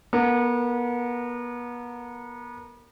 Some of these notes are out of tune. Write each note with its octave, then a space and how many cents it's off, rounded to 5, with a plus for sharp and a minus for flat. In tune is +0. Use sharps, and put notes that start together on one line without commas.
B3 -35 A#4 -20